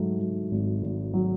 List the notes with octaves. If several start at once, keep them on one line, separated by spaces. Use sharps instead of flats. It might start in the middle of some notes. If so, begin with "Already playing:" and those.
Already playing: G#2 F#3 A3
F#3
G#1
G#1
F#3